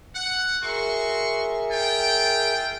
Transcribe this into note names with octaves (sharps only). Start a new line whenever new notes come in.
F#5
F#4 G#4 A#4 E5 C6 C#6
F4 G5